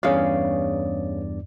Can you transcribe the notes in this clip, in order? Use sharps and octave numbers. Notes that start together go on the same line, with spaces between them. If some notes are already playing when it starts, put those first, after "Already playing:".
E2 G2 C#4 G#4 D5 F5